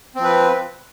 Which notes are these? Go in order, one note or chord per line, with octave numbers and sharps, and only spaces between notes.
F3 C4 B4